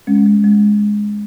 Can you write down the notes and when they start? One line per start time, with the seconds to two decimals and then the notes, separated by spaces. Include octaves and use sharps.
0.07 G#3 C#4
0.26 G#3
0.44 G#3